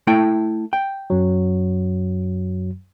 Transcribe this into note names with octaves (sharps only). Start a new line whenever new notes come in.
A3 E4 G5
G5
F#2 F#3